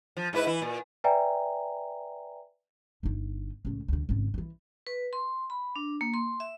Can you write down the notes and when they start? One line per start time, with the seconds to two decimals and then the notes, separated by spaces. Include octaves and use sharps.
0.17 F3
0.33 G#2 E4 B4
0.47 E3 E4
0.62 A#2
1.04 B4 D5 E5 G5 G#5 A#5
3.03 G1 D#4
3.65 C#2 A2
3.88 D2 D3
4.09 G#1 C#3
4.34 D#3 E3
4.87 B4
5.13 C6
5.50 B5
5.76 D4
6.01 A#3
6.14 C6
6.40 E5